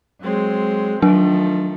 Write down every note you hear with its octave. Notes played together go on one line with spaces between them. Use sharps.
F#3 G#3 C4
D#3 F3 F#3 A3 D4